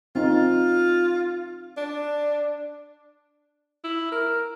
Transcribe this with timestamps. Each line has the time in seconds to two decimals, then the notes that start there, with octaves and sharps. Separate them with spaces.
0.15 C4 D#4 F4
1.77 D4
3.84 E4
4.12 A#4